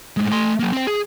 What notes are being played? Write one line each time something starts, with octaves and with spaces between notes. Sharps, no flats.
A2 G#3
A3 C6
F#3 A#3
C4 C5
G#4